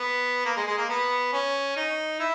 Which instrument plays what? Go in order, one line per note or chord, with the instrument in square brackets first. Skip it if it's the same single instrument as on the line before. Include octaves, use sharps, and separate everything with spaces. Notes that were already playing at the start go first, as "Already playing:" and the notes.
Already playing: [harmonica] B3
A#3
G#3
G#3
A#3
B3
C#4
D#4
E4